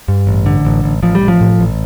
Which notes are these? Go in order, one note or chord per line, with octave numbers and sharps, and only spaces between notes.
G2
A1
D3
A1
A1
A1 F3
G3
A1
F3
A2
A1